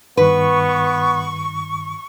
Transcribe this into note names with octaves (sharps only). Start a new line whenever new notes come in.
G2 D#3 B3 B4 C#6